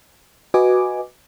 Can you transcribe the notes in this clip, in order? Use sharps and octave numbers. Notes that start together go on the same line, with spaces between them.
F#4 B4 D#5 G#5 D6